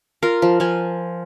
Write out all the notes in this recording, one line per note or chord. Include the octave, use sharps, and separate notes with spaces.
F4 A#4
F3
F3 G#5